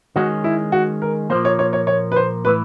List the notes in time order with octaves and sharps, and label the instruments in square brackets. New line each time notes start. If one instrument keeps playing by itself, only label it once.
[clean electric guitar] D#3 G#3 C#4 [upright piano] F#4
[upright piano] E4
F#4
A#4
[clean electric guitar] A#2 F3 A#3 [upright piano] C5
[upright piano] C#5
C#5
C#5
C#5
B4
C5
[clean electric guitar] A2 E3 [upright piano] B4